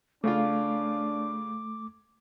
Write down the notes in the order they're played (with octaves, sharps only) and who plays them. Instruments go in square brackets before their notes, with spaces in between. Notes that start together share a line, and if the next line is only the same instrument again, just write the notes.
[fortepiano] C#3 F4 [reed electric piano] A3 [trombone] D4 [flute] D6